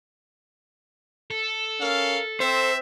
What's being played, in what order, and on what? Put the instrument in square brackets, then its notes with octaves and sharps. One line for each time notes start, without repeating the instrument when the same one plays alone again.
[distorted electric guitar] A4
[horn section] C#4 A#4 F5
[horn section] C4 [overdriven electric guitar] C5 [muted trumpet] E5